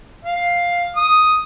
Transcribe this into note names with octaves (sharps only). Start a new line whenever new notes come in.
F5
D#6